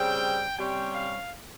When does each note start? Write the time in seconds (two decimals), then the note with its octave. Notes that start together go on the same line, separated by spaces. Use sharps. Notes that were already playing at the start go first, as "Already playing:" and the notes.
Already playing: C#3 G3 C4 G5
0.57 C3 G3 C#4 G5
0.94 F5